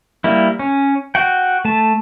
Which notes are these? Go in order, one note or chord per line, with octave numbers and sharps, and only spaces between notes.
G3 A#3 E4
C#4
F#4 F#5 G5
A3 A5